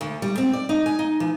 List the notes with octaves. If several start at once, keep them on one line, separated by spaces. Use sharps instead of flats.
D2
G3
C4
D5
D#4
G#5
D#4
E3